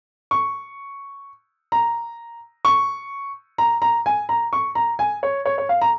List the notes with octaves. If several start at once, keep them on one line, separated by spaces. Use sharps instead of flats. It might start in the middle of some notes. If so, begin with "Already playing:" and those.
C#6
A#5
C#6
A#5
A#5
G#5
A#5
C#6
A#5
G#5
C#5
C#5
C#5
F5
A#5